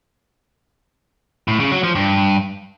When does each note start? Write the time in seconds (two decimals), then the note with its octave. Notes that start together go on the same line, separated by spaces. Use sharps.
1.48 A2
1.60 C#3
1.72 F#3
1.83 F3
1.95 G2